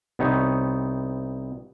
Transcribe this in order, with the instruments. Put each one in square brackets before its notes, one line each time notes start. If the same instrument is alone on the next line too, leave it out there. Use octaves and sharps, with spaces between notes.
[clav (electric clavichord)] C2 B3 C4 D#4 C#5